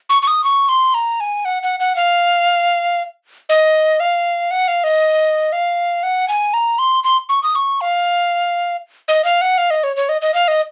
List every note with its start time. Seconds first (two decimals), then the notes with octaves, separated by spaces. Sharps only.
0.09 C#6
0.22 C#6
0.28 D#6
0.44 C#6
0.69 C6
0.94 A#5
1.20 G#5
1.45 F#5
1.63 F#5
1.80 F#5
1.96 F5
3.49 D#5
4.00 F5
4.51 F#5
4.68 F5
4.84 D#5
5.53 F5
6.03 F#5
6.28 G#5
6.54 A#5
6.79 C6
7.04 C6
7.29 C#6
7.43 D#6
7.55 C#6
7.81 F5
9.08 D#5
9.24 F5
9.41 F#5
9.58 F5
9.71 D#5
9.84 C#5
9.96 C#5
10.09 D#5
10.22 D#5
10.34 F5
10.48 D#5